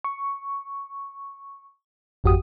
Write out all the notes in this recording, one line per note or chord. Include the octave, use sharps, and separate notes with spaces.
C#6
G#1 F2 F#4 G4 D#6